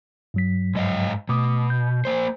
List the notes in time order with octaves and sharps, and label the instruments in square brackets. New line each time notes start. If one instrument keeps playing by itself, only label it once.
[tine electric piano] G2 F#3 B6
[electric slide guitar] G#2 D#5 F5
[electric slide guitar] B2 [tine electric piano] A3 D6 D#6
[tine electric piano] G6
[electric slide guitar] A#3 C5